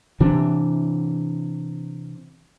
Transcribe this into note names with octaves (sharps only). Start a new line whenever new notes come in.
C3 E3 D4